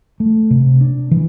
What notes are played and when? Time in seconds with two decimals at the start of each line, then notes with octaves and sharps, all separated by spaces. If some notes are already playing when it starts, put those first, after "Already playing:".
0.20 A3
0.51 C3
0.81 D4
1.11 E3